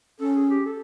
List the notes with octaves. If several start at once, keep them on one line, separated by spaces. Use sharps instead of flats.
C#4 A4
G#4
G4
A4